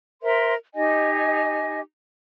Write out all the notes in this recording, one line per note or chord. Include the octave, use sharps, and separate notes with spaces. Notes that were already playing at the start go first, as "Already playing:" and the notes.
A#4 C5 E5 C6
D#4 G4 D#5 G#5